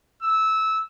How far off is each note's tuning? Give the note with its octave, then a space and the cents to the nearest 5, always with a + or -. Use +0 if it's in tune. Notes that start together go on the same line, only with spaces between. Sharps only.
E6 -15